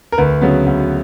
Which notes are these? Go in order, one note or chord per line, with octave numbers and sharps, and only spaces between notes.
A#4
D2 B4
C#3 F#3 B3
D2